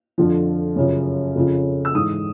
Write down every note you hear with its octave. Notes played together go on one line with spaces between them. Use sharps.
F2 D3 F3
F#2 C#3 F3
F2 C#3 F3
E6
G#2 E3 D#6